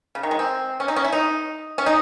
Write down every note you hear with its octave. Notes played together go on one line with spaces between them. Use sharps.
C#3
D#3
G#3
C4
C#4
D#4
C#4
E4
D#4
C#4
D#4